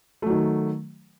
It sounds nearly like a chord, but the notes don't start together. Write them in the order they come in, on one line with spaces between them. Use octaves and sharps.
A3 F#3 D#3